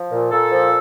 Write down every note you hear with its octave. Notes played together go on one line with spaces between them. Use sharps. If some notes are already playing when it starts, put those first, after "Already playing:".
Already playing: F3
A#2
A#2 A4
F3